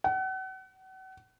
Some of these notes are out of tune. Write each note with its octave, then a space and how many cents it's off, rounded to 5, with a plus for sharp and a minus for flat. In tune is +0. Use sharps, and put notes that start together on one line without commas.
F#5 +35